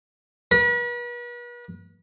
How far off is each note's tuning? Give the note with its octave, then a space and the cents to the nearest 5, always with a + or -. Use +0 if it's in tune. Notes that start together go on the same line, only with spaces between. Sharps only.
B4 -40